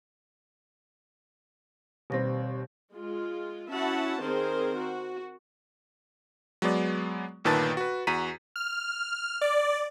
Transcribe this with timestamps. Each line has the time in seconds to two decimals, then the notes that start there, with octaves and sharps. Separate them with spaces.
2.10 D#2 B2 G3 C4 A#6
2.92 G#3 F4
3.70 C#4 E4 F#4 E5 F#5 A5
4.22 D#3 C4 G#4 A#4 C5
4.77 F#4
6.62 F#3 G#3 B3 D5
7.44 G1 A#2 D#3 B4 A5 A6
7.77 F#4 B4
8.07 E2 F#4 A#5 B6 D#7
8.56 F6
9.41 D5